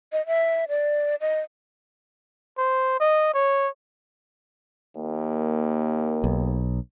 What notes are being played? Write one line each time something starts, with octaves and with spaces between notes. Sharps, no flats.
D#5
E5
D5
D#5
C5
D#5
C#5
D#2 A#3
B1